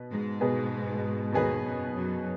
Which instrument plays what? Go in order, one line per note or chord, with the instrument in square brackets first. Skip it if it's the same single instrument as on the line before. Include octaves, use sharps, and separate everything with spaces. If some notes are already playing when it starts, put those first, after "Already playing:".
Already playing: [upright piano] B2 B3 B4
[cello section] G#2 G#3
[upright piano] B2 B3 G#4 B4
[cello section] D#2 D#3 [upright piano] B2 B3 G#4 B4
[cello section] F#2 F#3
F#2 F#3